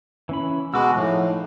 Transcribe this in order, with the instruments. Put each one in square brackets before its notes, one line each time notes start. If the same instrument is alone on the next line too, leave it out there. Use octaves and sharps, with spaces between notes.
[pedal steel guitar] E3 C#4 B5
[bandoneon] B2 G#3 F#4 [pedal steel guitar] B5 D6 E6
[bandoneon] A2 [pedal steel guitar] F3 D#4